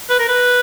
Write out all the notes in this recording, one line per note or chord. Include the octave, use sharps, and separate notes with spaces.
B4
A#4
B4